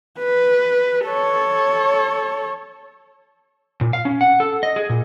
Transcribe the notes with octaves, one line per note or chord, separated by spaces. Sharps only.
B4
A4 C#5
A#2
F5
C#4
F#5
A4
D#5
G#4
A#2